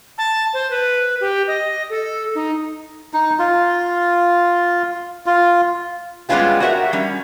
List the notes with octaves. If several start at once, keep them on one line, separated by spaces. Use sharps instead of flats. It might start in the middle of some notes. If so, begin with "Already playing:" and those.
A5
C5
B4
G4
D#5
A4
D#4
D#4
F4
F4
G3 G#3 B3 C#4 F4 G4
F#4 G4 A#4 C5 E5 F#5
G3 C#4